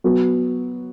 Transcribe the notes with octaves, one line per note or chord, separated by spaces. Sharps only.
F#3 B3 F#4